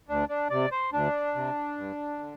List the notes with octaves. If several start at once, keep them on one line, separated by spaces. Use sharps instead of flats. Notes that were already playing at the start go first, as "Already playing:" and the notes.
D2 D4
D4
C3 D5
C5
D2 D4
C3
G2
D3